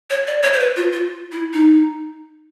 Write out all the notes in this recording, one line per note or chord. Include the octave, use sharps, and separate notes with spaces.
C#5
D5
C#5
C5
B4
F4
F4
E4
D#4